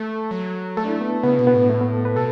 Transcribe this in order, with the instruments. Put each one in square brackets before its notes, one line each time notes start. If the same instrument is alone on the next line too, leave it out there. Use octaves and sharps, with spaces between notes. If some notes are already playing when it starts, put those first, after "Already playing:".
Already playing: [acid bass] A3 [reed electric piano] A4
[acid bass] F#3
[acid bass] A3 [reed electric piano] A4
[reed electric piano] D4
E4
B3
[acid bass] C#3 [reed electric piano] B3
[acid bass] B2
[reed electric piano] B3
[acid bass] A2
[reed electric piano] A3
B3
A4
B4
[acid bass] B2 [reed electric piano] A4